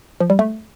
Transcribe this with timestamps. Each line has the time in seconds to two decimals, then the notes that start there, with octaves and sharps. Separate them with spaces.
0.20 F3
0.30 G3
0.39 A3